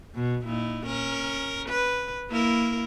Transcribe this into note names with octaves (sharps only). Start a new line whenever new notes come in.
B2
A#2 D#4 E4
C#4 A#4
B4
A#3 E4 A#4